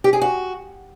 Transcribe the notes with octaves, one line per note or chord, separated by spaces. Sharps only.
G4
G#4
F#4